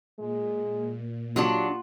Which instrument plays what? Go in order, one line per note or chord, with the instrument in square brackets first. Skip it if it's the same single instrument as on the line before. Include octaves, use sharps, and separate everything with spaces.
[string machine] A#2 [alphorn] G#3
[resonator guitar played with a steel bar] F#3 D4 [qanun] F4 F#5 [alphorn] G4